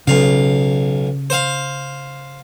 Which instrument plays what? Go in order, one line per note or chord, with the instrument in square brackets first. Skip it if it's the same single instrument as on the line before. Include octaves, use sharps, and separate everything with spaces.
[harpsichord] B1 F5 [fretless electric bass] C#3
[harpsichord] C5 F5